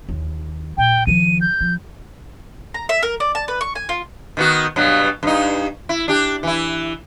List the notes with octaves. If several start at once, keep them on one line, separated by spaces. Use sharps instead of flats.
D#2
A#2 G5
D#3 F3 D#7
G6
F3
A#5
E5
A#4
D5
A5
B4
C#6
G#5
F4
D#3 B3 F#4
G2 B2 F#3
G2 D#4
E4
D4 G4
E3 E4